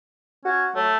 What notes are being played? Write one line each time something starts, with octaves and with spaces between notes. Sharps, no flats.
C#4 F#4
F#3 A3